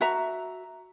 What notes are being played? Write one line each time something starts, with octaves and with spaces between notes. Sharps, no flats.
F#4 E5 A#5